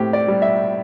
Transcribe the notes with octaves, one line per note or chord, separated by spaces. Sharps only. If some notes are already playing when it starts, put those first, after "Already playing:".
Already playing: A2 C4 G4
D5
G3
E5